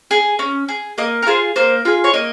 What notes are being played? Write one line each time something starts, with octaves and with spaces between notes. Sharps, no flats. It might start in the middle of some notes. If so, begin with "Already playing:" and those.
G#4
C#4
G#4
A#3 D#5
A#4
F4 G#4 C5
A#3 C5
F4 G#4
C#5
A#3 D#5